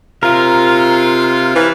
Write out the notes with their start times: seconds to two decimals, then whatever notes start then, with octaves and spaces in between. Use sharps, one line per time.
0.23 C3 F4 A#4
1.56 E3